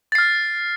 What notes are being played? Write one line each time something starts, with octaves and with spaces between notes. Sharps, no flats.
F6 A6 C7